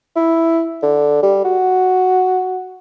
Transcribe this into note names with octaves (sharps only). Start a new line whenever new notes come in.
E4
D3
G3
F#4